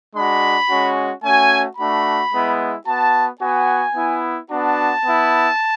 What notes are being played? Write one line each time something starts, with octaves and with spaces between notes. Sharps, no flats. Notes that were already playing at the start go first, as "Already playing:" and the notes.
G#3 D4 F#4 B5
G#3 C#4 F#4
A3 C#4 F#4 G#5
A3 D4 F#4 B5
G#3 B3 E4
B3 F#4 A5
B3 F#4 G#5
B3 E4
B3 D4 F#4 A5
B3 E4